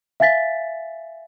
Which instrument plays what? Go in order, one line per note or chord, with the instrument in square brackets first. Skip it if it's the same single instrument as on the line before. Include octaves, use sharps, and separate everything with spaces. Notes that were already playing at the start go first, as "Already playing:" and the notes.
[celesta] E5 F5 G#5 A6 B6